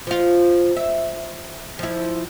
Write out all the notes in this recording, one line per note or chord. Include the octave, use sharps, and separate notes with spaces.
F3 F4
E5
F3 E4